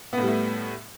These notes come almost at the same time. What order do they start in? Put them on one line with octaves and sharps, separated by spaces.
B3 A2 G3 A3